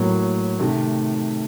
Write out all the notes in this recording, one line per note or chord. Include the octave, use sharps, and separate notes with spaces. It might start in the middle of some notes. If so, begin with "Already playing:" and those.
Already playing: A2 F#3 A#3
C3 D#3 A3